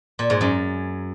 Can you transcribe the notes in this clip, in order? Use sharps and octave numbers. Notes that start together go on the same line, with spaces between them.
A#2
G#2
F#2